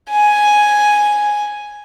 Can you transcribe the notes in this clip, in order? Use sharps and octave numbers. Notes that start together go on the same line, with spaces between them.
G#5